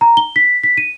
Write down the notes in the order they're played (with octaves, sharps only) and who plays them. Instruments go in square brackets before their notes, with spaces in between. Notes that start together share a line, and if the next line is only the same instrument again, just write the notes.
[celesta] A#5
G7
B6
B6
D#7